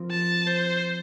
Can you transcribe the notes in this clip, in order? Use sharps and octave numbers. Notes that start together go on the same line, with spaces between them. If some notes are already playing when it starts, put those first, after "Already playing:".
Already playing: F3 C4 F4 A#4
A5
C5